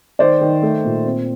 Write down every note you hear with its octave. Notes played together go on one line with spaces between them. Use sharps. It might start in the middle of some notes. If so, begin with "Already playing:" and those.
D#3 C5 D5
D#3
A3
A#2
C4